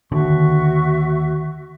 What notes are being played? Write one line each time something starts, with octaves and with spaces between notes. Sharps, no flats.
D#2 D3 F#4 E5 C#6